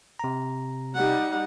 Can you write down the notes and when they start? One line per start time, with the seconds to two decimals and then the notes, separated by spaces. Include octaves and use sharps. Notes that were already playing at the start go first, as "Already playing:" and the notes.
0.19 C3 A#5
0.95 G3 D#4 F#5